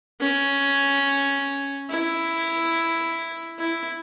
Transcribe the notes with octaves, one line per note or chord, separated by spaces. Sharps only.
C#4
E4
E4